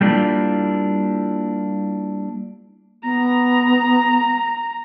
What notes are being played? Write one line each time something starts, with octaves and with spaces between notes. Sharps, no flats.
G3 A3 A#3 D4 E4 F4
B3 A#5